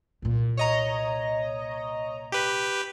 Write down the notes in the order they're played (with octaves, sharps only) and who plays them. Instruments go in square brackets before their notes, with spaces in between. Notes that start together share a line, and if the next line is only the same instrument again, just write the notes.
[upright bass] C2 A#2
[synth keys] C#5 D#5 A#5
[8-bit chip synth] G4 B4